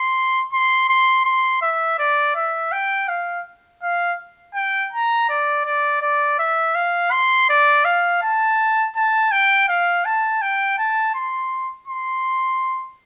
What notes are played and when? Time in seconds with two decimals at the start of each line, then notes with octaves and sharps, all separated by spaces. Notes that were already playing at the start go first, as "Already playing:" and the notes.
Already playing: C6
0.52 C6
0.89 C6
1.25 C6
1.61 E5
1.98 D5
2.35 E5
2.72 G5
3.08 F5
3.83 F5
4.55 G5
4.92 A#5
5.29 D5
5.65 D5
6.01 D5
6.39 E5
6.75 F5
7.11 C6
7.49 D5
7.85 F5
8.22 A5
8.96 A5
9.31 G5
9.69 F5
10.05 A5
10.41 G5
10.78 A5
11.14 C6
11.88 C6